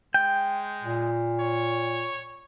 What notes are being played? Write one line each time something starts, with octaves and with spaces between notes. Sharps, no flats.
G#3 G5
A#2
C#5